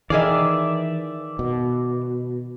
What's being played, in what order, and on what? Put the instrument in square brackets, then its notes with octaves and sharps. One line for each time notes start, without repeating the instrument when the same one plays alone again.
[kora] D#3 G#4 F5 [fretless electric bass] E3 [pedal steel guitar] D5 E5
[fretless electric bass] B2